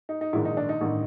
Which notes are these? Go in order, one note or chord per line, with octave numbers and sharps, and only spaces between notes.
D#4
D#4
A#1 G#2 D#3 E4
D#4
D4
D#4
A1 G2 D#3